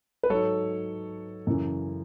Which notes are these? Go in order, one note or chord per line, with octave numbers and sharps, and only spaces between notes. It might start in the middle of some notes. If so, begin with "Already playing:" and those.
B4
G#2 F#3 A4 C#5
F#2 C#3 E3